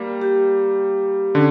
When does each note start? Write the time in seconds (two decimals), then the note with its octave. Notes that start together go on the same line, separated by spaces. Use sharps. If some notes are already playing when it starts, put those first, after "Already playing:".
Already playing: G3 A#3
0.21 G4
1.35 D3 C#4